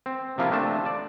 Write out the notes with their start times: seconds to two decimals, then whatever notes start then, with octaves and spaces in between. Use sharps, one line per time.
0.06 C4
0.38 C3 F3 A#3 E4 F4
0.51 C3 A3 C4 D4 A5
0.85 D5 A5